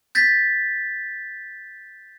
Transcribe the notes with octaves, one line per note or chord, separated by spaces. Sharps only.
G6 A6 B6